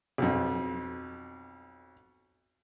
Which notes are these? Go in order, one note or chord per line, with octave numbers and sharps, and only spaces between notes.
B1 F2